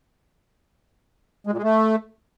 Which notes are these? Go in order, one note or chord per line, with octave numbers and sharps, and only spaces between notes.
G#3
A#2
G#3
A3